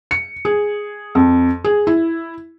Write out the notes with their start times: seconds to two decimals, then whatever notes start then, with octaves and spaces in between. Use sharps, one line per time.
0.11 C#7
0.45 G#4
1.15 F2
1.64 G#4
1.87 E4